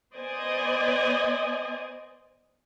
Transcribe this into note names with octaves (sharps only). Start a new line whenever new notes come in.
B3 C5 D5 D#5 G#5